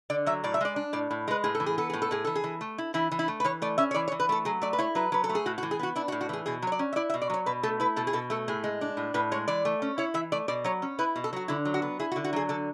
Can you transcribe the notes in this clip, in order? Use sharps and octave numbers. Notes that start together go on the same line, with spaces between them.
D3 D5
F#3 E5
A2 D5
E5
G#3 D5
D4
A2 D5
A2
G#3 B4
A2 G#4
A4
E3
G#4
B3 A4
A2 G#4
A4
A2 G#4
E3 A4
G#4
E3
A3
E4
E3 E4
E3
E4
A3
B4
E3 C#5
A3 D5
C#4 E5
C#5
E3 D5
C#5
E3
B4
A3 A4
F#3 G#4
A3 D5
B4
E4 C#5
F#3 B4
F#3 B4
A4
A3
G#4
A2 F#4
F#4
E3
G#4
B3 F#4
D4 E4
F#4
A2
F#4
E3 G#4
B2 G#4
F#3 C#5
D5
C#4
E5
E4 D5
E5
B2
D5
F#3 C#5
B2 B4
A3 A4
E4 B4
B2 A4
G#4
B2 A4
A3 A4
A2 G#4
G#3
D4
A2
A2 B4
G#3 C#5
E3 D5
A3
C#4
E4 C#5
E3 E5
A3 D5
B2 D5
F#3 C#5
C#4
E4 B4
B2
A4
F#3 F#4
D3 E4
F#3
F#4
B3
E4 G#4
F#4
D3
F#4
F#3 G#4
D3 A4